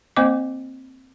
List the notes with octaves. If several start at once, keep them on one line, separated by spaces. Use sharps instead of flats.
A#3 C4 C5 D#5 D6